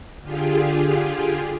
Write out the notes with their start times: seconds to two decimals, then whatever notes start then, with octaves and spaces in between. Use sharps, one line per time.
0.22 D3 F4 G4 G#4